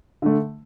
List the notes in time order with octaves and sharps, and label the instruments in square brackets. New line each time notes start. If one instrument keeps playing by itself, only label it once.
[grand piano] D3 A3